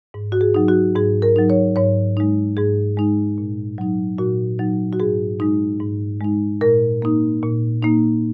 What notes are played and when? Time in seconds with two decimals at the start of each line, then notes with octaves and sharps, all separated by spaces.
0.14 G#2
0.32 F#4
0.41 G#4
0.54 F#3 D#4
0.68 F#4
0.95 G#2 G#4
1.22 A#4
1.36 F#3 D#4
1.50 C#5
1.76 G#2 C#5
2.17 G#3 D#4
2.57 G#2 G#4
2.97 G#3 D#4
3.38 A#2
3.78 F#3 D#4
4.18 A#2 F#4
4.59 F#3 D#4
4.93 F#4
5.00 G#2 G#4
5.40 G#3 D#4
5.80 G#2
6.21 G#3 D#4
6.61 A#2 A#4
7.02 A#3 D#4
7.42 A#2
7.83 A#3 D#4